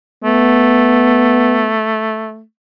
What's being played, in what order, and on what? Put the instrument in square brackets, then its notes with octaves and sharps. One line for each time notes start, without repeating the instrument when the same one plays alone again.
[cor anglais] A3 [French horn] B3